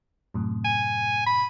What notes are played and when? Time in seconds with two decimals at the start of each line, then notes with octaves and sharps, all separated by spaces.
0.34 F#2 A2 C3
0.65 G#5
1.26 B5